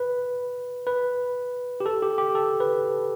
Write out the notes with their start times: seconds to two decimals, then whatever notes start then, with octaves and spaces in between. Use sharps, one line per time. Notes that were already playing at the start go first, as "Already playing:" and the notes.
Already playing: B4
0.87 B4
1.80 G4
1.86 A4
2.02 G4
2.18 G4
2.35 A4
2.60 B4